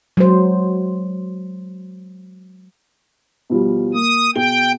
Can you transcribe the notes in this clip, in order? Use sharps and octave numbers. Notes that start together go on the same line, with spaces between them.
F#3 G#3 C5
B2 F3 G3
A#3 D#6
B2 G#4 G5 G7